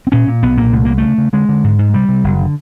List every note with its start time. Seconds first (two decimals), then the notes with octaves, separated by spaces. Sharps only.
0.07 C4
0.12 A#2 C#4
0.27 A#2
0.42 B1 B3
0.57 A#2 A#3
0.73 C2 A3
0.85 C2 A#3
0.98 C#3 A3
1.18 C#3
1.33 D3 G#3
1.49 D3
1.64 G#2
1.79 G#2
1.94 C3 G3
2.09 C3
2.24 F#1
2.39 D3